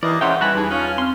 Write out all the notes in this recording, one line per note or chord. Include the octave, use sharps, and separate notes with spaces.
D#2 E3 A#3 D5 D#5
G#2 C#4 C#5 E5 F#5 G5 C6
E3 G3 F#4 B4 A5 B5 F#6
E2 G3 D#4 G#4 A5
C#4 F4 F5 D#6
C4 C6 F6